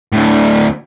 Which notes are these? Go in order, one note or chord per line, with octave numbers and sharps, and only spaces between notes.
D2 A2